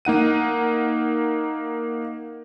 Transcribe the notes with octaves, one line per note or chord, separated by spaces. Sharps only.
A#3 D#4 F#5 D#7